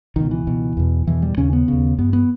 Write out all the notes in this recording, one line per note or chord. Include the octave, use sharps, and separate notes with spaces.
C#2 B2 D#3
E3
C#2 B2
E2 B2
E2 B2 E3
G3
D#2 C#3 C#4
B3
D#2 C#3
G2 B3
B3